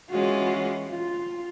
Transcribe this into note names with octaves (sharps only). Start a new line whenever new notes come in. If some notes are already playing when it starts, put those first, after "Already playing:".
E3 G#3 C#4 F4 F#4
F4